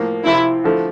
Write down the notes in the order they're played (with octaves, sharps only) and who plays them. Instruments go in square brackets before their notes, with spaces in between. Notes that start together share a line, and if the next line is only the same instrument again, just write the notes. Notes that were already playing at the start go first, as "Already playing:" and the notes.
Already playing: [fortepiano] A2 F3 A#3
[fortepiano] C3 F3 C4 [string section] E4
[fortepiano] D3 F3 A3